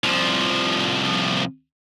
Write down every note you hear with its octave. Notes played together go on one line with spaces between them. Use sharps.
C2 F3